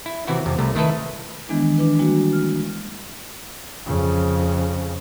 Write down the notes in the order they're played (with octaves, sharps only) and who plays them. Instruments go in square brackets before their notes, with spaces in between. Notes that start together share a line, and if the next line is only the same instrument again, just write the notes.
[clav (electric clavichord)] E4
C3 E3 C4 E4 F#4
F2 C3
C2 C3 A3
D#3 A3 E4 A4 B4
[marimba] D#3 E3 G#3 B3 D4 E4
D4 E4 B4
G3 G#3 A#3 E4 F#4
F6
[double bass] F2 C#3